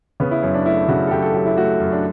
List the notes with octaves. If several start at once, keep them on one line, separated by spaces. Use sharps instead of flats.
C#3 B3
E4
F#2 C#4
D4
A3 E4
C#3 F#4
A4
F#2 G4
A4
F#3 G4
E4
A3 F#4
F#2
D4